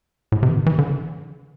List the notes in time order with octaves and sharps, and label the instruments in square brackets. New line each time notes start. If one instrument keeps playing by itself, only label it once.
[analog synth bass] A2
C3
E3
D3
E3
D3